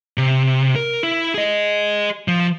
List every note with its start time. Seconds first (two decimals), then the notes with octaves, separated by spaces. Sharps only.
0.18 C3
0.76 A#4
1.03 E4
1.34 G#4 D#5
2.28 F3